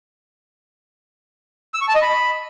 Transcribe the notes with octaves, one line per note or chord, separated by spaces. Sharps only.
E6
C#6
A5
D#5
B5